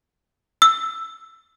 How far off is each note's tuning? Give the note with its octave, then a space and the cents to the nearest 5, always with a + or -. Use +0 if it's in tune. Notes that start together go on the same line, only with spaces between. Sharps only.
E6 +5